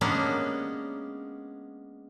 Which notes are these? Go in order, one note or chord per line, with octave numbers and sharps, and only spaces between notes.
G#3 A#3 B3 C#4 D4 G4